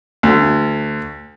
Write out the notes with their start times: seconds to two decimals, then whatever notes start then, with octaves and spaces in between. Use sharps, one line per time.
0.23 D2